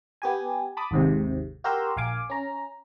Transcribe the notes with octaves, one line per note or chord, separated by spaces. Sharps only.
B3 G4 G#5
A5 B5 D6 D#6
G#1 D#2 G#2 C3
F#4 G4 A#4 A#5 C6 E6
A#1 F5 G#5 D6
C#4 A#5